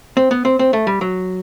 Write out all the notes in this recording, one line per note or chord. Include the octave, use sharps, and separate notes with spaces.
C4
B3
C4
C4
A3
G3
F#3